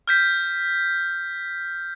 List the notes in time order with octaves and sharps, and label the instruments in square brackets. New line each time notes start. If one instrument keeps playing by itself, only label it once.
[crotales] F6 G6 B6